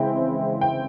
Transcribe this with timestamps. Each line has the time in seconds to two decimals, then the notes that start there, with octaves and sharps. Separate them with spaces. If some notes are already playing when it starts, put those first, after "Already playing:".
Already playing: C#3 E3 G#3 C4 E4 G5
0.61 G5